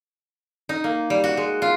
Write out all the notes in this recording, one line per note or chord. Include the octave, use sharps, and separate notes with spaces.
D#4
A#3
G3
F#4
G#3
F4